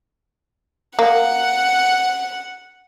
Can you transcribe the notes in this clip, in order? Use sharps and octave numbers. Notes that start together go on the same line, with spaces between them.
A#3 F#5